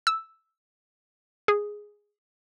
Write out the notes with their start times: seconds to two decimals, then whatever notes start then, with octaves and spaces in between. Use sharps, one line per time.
0.07 E6
1.48 G#4